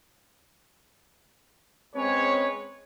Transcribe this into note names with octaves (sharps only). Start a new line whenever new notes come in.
G#3 C4 C#4 G#4 B4 C#5